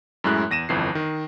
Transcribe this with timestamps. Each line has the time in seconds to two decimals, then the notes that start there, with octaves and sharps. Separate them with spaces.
0.24 F#2 A2 G#3 E4 F#6
0.50 E2 A#6 D#7 E7
0.69 G1 F2 E3 C7
0.95 D#3